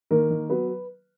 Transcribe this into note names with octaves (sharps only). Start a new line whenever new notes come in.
D#3 A#3 A#4
D#3
F#3 B3 B4